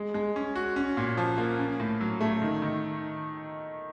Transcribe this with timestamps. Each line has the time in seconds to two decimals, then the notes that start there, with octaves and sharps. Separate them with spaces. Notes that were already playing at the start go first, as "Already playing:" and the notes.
Already playing: G#3
0.14 G#3
0.36 C#4
0.55 F#4
0.76 C#4
0.97 A#2
1.17 F3
1.38 A#3
1.59 C#4
1.80 A2
2.01 F#3
2.21 A3
2.42 D#3
2.62 D#3